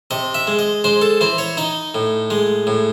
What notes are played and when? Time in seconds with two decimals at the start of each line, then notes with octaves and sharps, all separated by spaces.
0.11 C3 D#5
0.34 E5
0.47 G#3
0.59 D#5
0.84 G#3 C5
1.02 A4
1.21 E3 C5
1.38 C#5
1.57 D#4 D#5
1.94 A2
2.30 G#3
2.67 A2